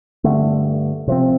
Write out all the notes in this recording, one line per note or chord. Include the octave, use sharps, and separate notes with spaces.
G2 D3 A3
C3 F3 C4